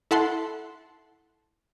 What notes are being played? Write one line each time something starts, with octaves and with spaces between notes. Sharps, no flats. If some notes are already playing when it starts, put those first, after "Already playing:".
E4 A4 F#5 A5 C6